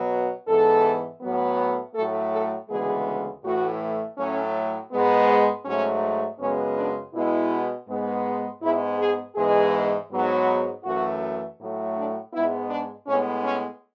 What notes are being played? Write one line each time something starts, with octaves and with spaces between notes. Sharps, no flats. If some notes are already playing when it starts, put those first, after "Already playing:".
Already playing: B2 F#3 B3
G#2 E3 B3 A4
A2 F#3 B3
A2 F#3 A3 A4
A4
D2 C#3 E3 G#3 B3 G#4
A2 E3 A3 F#4
A2 F#3 A3 C#4
G#2 G#3 B3
G#2 F#3 A3 C#4
F#2 C#3 G#3 B3 C#4
D4
B2 G#3 B3 E4
G#2 G#3 B3
G#2 G#3 B3 E4
G#4
G#2 E3 G#3 B3 G#4
G#2 F#3 B3
F#2 E3 A3 F#4
A2 F#3 A3
D4
G#2 G#3 B3 E4
D4
A2 G#3 B3 C#4
C#4